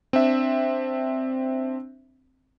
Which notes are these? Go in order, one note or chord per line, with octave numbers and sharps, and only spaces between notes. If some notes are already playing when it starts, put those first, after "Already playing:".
C4 D4 E5